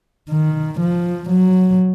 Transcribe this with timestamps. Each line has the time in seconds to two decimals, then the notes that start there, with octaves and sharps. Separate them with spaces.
0.30 D#3
0.80 F3
1.30 F#3